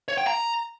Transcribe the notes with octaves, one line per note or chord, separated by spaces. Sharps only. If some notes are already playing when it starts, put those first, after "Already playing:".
C#5
G5
A#5